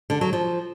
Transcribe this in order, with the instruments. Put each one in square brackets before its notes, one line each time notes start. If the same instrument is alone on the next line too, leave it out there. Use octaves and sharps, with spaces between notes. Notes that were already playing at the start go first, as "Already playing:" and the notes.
[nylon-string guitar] D3
F#3
F3